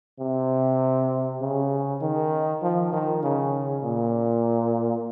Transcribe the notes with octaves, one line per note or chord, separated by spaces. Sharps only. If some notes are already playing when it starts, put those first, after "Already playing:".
C3
C#3
D#3
F3
D#3
C#3
A#2